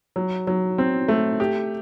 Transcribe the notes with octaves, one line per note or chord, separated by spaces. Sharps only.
F#3
F#3
C4
A3
G4